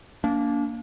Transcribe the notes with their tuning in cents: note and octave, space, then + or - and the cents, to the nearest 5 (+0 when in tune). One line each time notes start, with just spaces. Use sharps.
A#3 +0 D4 -30